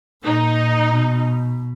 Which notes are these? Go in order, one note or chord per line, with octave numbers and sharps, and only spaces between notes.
A#2 D#4
B2